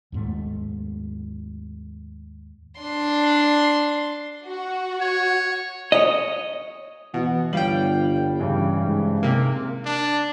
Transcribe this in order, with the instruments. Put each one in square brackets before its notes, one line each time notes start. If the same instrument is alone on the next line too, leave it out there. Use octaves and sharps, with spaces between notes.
[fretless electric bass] D#2 G#2 A3
[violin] D4 C6
[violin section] F#4
[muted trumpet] C#5
[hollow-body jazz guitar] C#5 D#5
[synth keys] B2 [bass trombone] E3 [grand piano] F#5
[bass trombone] G1 [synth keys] G3 G5 [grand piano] C#5 F5 F#7
[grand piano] G2 C#3 E3
[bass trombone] G#2
[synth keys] C3 A#3
[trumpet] D4